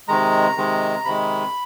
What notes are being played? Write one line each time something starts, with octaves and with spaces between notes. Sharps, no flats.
C3 D#3 G#3 A#5
C3 D#3 G#3
C3 D#3 G#3 B5